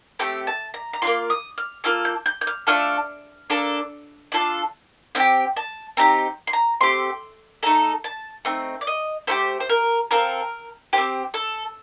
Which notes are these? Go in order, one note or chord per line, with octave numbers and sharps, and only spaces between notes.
A3 C4 G4 G5
A5
A#5
A#5
D4 F4 C6
A#3
D#6
F6
A#3 F4 A4 F6
G6
G6
G6
F6
A3 D4 F4 A4 F6
A#3 D4 A4
D4 F4 A4
C4 D#4 G4 G5
A5
C4 D#4 G4 A#5
C6
A#5
A3 C4 G4 C6
A3 D#4 A4 A#5
A5
A3 C4 D#4
D5
D#5
A3 D#4 G4 C5
C5
A#4
C4 F4 A4 A#4
C4 G4 C5
A4